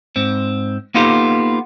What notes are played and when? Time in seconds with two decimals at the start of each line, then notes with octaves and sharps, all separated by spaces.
0.16 G#2 C4
0.94 A#3 B3 D#4 F4 G4 A4